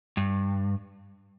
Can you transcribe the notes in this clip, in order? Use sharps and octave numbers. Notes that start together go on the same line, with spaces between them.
G2